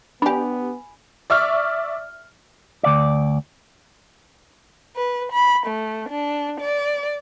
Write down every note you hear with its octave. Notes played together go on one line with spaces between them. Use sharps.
B3 D4 G4 G#5 B5
D5 E5 C#6 F6
D2 D5
B4
B5
A3
D4
D5